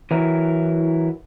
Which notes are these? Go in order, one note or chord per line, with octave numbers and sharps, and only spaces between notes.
E3 F#3 E4 A#4